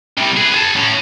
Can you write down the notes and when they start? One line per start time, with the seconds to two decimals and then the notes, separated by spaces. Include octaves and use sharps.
0.18 C3 G3
0.37 G#4 B4
0.54 G#4 A5
0.76 A2 C#4